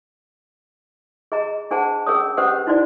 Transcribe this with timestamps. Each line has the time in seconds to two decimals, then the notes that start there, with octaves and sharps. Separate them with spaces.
1.32 G#4 D#5 A#5
1.71 D4 G#4 C5 F#5 A5
2.07 C#4 G#4 A#4 C#5 D#6
2.37 C#4 G4 B4 C5 F#5 D#6
2.67 D#4 E4 F#4 C5 D5